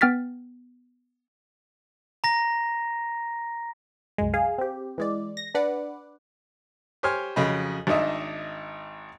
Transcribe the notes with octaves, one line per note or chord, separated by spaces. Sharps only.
B3 G5 F6 A6 B6
A#5 A#6
C2 F#2 G#3
G#4 F5
C4 G4
E3 G#3 D5
A#6
D4 B4 D5 F#5
G4 C5 C#5 G#5 C6 F6
F2 C#3 F#3 D#5 B5
G#1 D4 D#4 D#5 E5